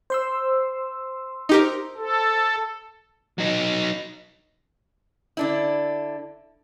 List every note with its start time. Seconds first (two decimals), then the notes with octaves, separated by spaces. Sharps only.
0.10 C5 C6 E6
1.49 D#4 G4 A#4
1.97 A4
3.38 F#3 D#4
5.37 D3 D4 E4